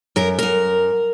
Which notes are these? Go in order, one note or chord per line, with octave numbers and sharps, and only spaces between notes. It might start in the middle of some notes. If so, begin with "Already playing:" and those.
F#2 A#4
F#2 A#4